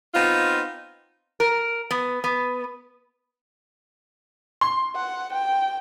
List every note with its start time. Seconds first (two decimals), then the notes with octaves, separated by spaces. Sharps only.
0.14 B3 C4 D#4 F4
1.40 A#4
1.91 B3
2.24 B3
4.61 C6
4.96 F#5
5.33 G5